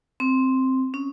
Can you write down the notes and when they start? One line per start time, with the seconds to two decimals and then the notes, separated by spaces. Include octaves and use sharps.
0.20 C4
0.94 C#4